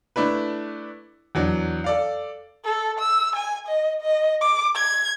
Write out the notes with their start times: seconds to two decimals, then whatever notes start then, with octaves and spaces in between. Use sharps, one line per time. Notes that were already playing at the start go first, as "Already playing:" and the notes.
0.16 A3 D4 E4 B4
1.35 E2 F#3 D4
1.84 A4 D5 F5
2.65 A4
2.99 E6
3.36 G#5
3.67 D#5
4.01 D#5
4.41 D6
4.75 G#6